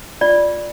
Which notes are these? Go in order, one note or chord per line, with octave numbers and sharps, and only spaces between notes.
F4 D5